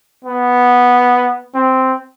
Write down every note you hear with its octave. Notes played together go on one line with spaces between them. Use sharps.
B3
C4